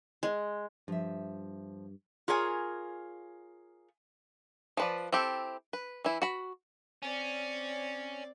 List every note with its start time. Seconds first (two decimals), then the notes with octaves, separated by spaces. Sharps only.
0.23 G#3
0.88 G2 F3 E5
2.28 F4 G#4 A#4 C#5 G#5
4.77 F3 B4 D5
5.12 C4 E4 G4 A4
5.73 B4
6.04 E3 E4
6.22 F#4 B5
7.03 C4 C#4 D5